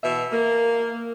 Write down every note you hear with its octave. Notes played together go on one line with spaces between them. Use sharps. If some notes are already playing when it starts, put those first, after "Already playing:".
B2 E3 E5
A#3